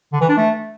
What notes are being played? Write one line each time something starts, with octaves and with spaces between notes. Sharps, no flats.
D3
E3
D4
A3